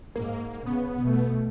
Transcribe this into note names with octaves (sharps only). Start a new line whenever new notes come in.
G#2 A#3
C#3 B3
B2 A3